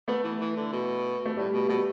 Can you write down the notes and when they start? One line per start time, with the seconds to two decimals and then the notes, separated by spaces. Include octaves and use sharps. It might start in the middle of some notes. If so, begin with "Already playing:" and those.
0.08 A3 B3
0.24 E3
0.40 E3
0.56 D3
0.72 B2
1.26 A3
1.37 A2 G3
1.53 B2
1.69 B2 A3